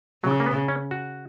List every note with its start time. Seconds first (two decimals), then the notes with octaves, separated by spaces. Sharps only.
0.24 C#3 F#3
0.40 A#3
0.46 B3
0.68 C#4
0.91 F#4